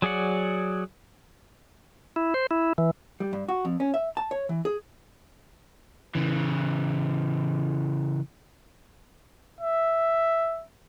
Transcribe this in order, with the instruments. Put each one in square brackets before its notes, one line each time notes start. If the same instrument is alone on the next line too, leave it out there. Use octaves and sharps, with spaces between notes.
[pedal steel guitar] F#3 G#4 D5 F#5
[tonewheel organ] E4
C5
E4
E3
[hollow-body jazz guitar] G3
G2
F#4
F2
C#4
E5
A5
C#5
E3
G#4
[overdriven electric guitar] C#3 E3
[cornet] E5